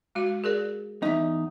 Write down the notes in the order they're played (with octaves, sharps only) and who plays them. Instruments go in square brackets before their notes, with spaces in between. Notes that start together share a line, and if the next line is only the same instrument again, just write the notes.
[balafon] G#3 F#4 F5
G#4 A#4 D5
[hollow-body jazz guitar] E2 D#4 [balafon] D#5 E5